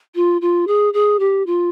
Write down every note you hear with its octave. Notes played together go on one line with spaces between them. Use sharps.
F4
F4
G#4
G#4
G4
F4